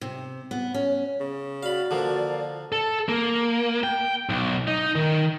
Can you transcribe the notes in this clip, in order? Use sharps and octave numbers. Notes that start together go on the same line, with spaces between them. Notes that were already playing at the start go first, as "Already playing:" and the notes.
C3
B3
C#4
C#3
F#4 D5 F5 B5
D3 F3 A#3
A4
A#3
G5
B1
D#4
D#3